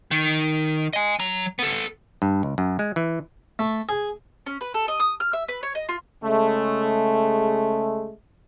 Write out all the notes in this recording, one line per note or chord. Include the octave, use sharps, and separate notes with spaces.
D#3
D#5 G#5
F#3 A#5
B3 A4
G2
C#2
F#2
G#3
E3
A3
G#4
C#4
B4
A4
D#5
D#6
F6
E5
B4
C#5
D#5
F4
C#3 G#3 A3